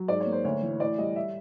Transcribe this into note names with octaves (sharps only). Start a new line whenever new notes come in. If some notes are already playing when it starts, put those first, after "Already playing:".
Already playing: F#3
G#2 D5
C#5
A#3
C5
D2 C#5
E3
A2 D5
G3 D#5
E5